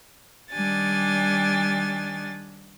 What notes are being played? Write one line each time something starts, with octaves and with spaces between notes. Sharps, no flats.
D#3 G3 D4 G#5 A6